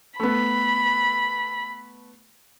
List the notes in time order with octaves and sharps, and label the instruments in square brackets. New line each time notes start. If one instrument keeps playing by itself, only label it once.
[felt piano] A3 B3 [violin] B5